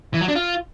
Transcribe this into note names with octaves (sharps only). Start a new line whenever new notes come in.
E3
F#3
D4
F4